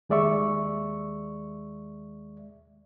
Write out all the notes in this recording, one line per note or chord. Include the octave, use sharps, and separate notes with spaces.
D#2 G#3 D5 E5 C#6